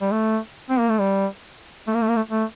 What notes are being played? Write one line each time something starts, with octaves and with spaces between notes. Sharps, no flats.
G3
A3
C4
A#3
A3
G3
A3
A#3
A3
A#3
A3
A3